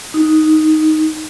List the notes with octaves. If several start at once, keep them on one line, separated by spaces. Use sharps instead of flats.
D#4